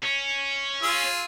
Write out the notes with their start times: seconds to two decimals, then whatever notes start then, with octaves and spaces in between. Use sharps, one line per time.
0.04 C#4
0.83 F4 G#4 E6